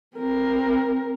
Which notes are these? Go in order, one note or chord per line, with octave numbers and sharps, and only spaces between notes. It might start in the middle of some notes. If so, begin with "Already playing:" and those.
C4 A#4